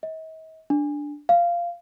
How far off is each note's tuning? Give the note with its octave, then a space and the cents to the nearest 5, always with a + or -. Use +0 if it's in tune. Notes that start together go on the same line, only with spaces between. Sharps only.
D#5 +45
D4 +0
F5 -15